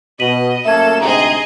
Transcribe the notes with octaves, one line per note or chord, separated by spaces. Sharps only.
B2 D#5 B6 D#7 F#7
F#2 A3 A#3 A4 E5 G#6 E7
D2 G#2 C3 G#4 D#5 A#5